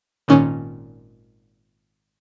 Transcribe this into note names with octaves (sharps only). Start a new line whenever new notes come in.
G#1 A#2 D#3 C#4